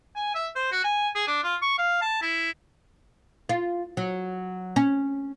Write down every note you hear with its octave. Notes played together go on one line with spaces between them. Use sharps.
G#5
E5
C5
F#4
G#5
G#4
D4
F4
C#6
F5
A5
E4
F4
F#3
C#4